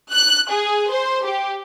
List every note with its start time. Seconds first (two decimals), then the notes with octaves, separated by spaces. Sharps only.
0.12 F#6
0.51 G#4
0.91 C5
1.26 G4